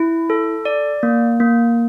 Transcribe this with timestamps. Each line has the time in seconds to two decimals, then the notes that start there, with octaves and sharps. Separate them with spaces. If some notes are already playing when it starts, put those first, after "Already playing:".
Already playing: E4
0.30 A4
0.65 D5
1.03 A#3
1.40 A#3